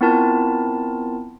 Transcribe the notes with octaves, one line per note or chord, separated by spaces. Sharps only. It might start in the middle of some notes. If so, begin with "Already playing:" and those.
B3 C4 E4 F4 A#4 A5